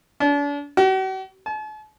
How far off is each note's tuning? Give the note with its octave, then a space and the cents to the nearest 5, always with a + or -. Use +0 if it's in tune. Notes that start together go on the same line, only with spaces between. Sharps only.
D4 -40
F#4 +45
A5 -45